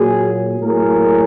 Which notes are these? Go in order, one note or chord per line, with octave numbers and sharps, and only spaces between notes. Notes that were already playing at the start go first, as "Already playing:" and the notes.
Already playing: A#2 F#3 A#3 F#4 G#4
A2 F#3 A#3 G#4 A#4